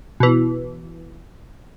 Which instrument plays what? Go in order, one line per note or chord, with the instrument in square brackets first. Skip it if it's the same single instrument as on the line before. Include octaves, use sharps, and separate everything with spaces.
[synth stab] B2 E3